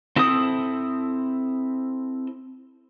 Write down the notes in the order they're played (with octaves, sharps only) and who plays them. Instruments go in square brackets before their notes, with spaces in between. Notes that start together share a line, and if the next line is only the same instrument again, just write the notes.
[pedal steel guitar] C4 E4 A4 C5 D#6